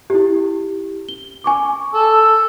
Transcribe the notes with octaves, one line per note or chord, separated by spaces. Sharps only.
E4 G4
G7
G#5 C#6 D6
A4